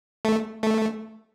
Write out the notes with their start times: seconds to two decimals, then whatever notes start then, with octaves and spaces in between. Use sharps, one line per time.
0.25 A3
0.63 A3